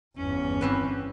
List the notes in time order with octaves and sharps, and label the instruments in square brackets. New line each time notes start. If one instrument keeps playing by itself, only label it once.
[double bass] G1 E2 [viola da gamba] C#4
[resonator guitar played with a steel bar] E3 C4 B4